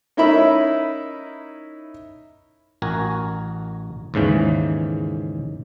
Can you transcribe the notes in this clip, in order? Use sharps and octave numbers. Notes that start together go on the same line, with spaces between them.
C#4 D#4 E4 A#4 E5 B5
A1 F#4 A#4 G#5
D#2 G#2 C#3 E3